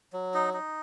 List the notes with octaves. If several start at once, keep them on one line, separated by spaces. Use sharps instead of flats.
F#3
D#4
D#4